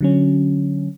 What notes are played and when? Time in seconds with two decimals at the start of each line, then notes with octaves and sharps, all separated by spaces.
0.01 D3 F#3 C#4